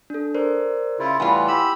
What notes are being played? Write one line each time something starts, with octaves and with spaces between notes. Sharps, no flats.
D4 A4
A#4 C5 D5
C#3 E4 F4
A2 E3 G3 B3 E4 F4 G5 G#5
G4 B5 E6